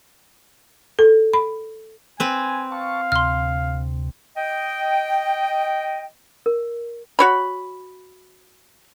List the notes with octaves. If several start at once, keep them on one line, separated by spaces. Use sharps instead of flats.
A4
B5
C4 B4 G#5
F5 A5 C#6
D2 C3 C6 F6
D#5 G5
A#4
F#4 C#5 B5